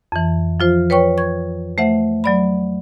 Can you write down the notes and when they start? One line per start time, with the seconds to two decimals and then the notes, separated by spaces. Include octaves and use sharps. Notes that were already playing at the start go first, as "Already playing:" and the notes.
0.12 F2 E3
0.60 F3 F4 C5
0.90 B4 C#5 G5 C#6
1.18 C#6 G#6
1.78 A3 C5 E5 F#5
2.24 F#3 D5 B5